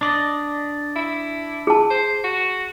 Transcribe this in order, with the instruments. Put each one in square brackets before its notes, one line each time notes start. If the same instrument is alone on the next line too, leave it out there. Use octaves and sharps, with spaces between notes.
[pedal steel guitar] D4 D5 D#5
[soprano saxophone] E4
[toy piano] G#4 A5
[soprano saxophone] C5
F#4